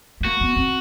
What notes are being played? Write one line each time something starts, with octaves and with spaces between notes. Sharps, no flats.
B3
A#3 F#4
B3
C4